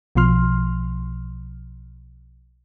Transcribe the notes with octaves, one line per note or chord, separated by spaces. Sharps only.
B1 B2 F3 C6 F6